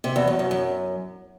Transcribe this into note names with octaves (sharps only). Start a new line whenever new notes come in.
C3
E2
F#2
F#2
F#2